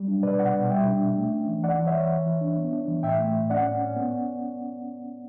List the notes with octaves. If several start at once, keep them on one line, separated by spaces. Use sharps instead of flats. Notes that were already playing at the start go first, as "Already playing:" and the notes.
Already playing: F#3 G3
D4
B2 B4 D5
B2 D5 F#5
B2
G3 E5 G5
D4
D4
A3
C#4
E3
E3 D5 F#5
E3
C#5 E5
E3
E3
E3
D4
B3
D4
E3
A2 E5 G5
A3
A2
C#4 D5 F#5
C#4
C#4
B3